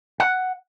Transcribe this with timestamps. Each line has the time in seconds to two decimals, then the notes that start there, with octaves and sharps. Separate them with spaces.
0.20 F#5